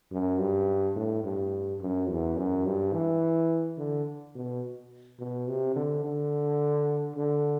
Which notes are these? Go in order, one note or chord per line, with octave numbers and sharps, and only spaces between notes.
F#2
G2
A2
G2
F#2
E2
F#2
G2
E3
D3
B2
B2
C3
D3
D3
D3